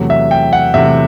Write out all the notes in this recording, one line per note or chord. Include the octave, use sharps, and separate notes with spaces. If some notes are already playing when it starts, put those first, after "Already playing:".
Already playing: E2 C3 F#3 A3
E5
G5
F#5
E2 C3 F#3 A3 E5